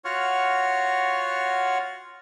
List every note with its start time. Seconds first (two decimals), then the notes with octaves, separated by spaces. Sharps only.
0.05 F4 F#4 C#5 F#5 C#6 F6